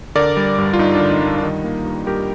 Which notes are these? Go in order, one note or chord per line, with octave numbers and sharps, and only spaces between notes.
D3 A#4 D5
G3
G2
F4
G2 D#4
D3 D4
D#4
G3
D4
D4
D#3 D#4
A#3
G2
G2 G4 A#4